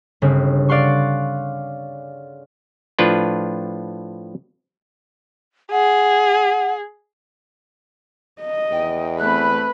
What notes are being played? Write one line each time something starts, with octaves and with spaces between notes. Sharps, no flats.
G1 C#3 C4
D5 F5 F#5 C6 C#6
A2 F3 D4 F4 B4
G#4 F#5
D#5
E2 G5
A3 C4 B4 B5 F#6